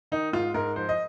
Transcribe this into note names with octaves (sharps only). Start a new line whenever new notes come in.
D#3 D#4
G#2 F4
G#2 A#4
F3 C5
D#5